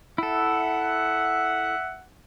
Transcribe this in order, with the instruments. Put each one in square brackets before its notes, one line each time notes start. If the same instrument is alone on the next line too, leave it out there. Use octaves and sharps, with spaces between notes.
[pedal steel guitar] E4 A4 [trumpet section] E5 F#5